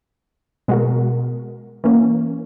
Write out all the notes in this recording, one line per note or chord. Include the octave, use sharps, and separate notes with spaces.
B2 G#3 B3 F#4 A#4
E3 A#3 C#4